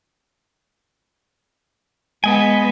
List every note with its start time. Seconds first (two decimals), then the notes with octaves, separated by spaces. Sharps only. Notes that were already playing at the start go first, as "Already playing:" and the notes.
2.24 G#3 B3 B4 D#5 G#5